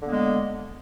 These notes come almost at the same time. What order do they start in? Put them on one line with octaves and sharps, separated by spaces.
D3 A#3 B3 G#3